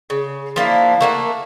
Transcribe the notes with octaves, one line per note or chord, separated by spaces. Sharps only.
C#3
F3 A#3 D4 E4
A3 A#3 F5 F#5